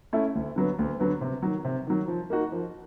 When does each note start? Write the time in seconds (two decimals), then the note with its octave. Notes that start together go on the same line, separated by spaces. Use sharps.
0.13 A3 C#4 E4 A4
0.35 D2
0.56 D3 F#3 B3
0.79 D2
1.00 D3 F#3 B3
1.21 C3
1.42 D#3 F#3
1.65 C3
1.87 D#3 F#3
2.08 F3
2.30 A#3 D#4 F#4
2.52 F3